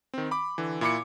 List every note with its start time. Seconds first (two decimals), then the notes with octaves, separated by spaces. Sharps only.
0.14 D#3 C4
0.31 B5 D6
0.58 D3 E3
0.81 A#2 E4 B5 D6 C#7